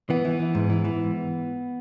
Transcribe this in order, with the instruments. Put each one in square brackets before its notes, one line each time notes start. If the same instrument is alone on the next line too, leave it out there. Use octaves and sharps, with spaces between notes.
[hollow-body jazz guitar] E3 B3
E3
E3
G#2
E3
E3